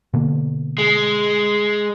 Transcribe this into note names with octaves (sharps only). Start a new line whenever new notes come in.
B2 D3 A#3
G#3